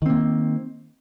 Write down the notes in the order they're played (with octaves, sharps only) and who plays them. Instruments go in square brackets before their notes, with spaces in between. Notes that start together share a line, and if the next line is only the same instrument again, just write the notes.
[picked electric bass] D#3
C4
A#3